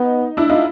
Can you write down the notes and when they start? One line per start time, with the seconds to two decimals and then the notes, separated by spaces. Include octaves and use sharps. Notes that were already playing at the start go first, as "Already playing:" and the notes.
Already playing: B3 D#4
0.37 D4 E4
0.49 D#4 F4